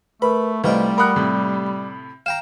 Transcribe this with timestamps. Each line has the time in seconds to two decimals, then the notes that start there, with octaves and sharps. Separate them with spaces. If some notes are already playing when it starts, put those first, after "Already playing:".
0.22 A3 A#4 B4 B5
0.64 C2 G3 A3 F4 B4 C5 D#5 G5
0.98 A#4 F#5 B5 D#6 F#6
1.16 A2 C3
2.26 F5 G5 A#5 E7